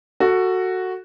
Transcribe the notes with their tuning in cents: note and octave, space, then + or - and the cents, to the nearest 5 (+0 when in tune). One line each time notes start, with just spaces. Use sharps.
F#4 +0 A4 +20